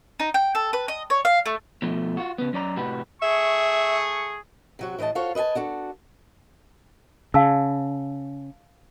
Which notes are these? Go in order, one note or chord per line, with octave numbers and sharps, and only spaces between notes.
D#4
G5
A4
B4
D#5
C#5
F5
A3
B2 F3 A3
F4 F#4
C#3 B3
F#2 C#4 D5 A#5
A2 C3 F#4 G4 B4 F#5
A3 G#4 E5 C#6
C3 F#3 F#4
A2 E3 C5 D#5 A5
F4 F#4 A4 C5 C#5 F5
B4 D#5 E5 G#5 A5
D4 F#4 A4
C#3 F5 A5 E6